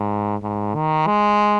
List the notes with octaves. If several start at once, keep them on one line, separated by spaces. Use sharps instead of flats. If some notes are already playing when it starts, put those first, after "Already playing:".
Already playing: G#2
G#2
D#3
G#3